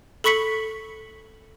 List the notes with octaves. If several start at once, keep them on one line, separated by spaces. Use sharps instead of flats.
A4 B5 C#6 B6 C#7 F#7